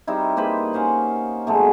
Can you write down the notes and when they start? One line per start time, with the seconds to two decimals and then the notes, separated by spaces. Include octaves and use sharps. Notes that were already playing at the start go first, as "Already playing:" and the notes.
0.07 G3 C4 D#4 E4
0.37 A#3 B4 C5 B5
0.73 C#4 C5 F5 F#5
1.47 B2 F#3 G#3 A3